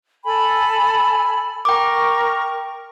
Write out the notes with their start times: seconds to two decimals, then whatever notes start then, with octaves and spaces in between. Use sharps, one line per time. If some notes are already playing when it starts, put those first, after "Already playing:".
0.25 A4 G#5 B5
1.65 A#4 G5 C#6 D6